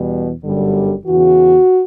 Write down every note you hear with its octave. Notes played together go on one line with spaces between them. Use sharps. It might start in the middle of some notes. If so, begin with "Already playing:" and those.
Already playing: E2 B2 G3
G1 F#2 D3 G3
E2 C#3 E3 F#4